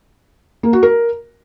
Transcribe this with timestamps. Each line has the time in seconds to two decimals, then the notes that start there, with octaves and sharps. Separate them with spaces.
0.63 A#3
0.73 F#4
0.83 A#4